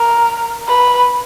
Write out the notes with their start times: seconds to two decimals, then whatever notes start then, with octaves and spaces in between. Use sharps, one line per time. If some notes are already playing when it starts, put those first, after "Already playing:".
Already playing: A#4
0.68 B4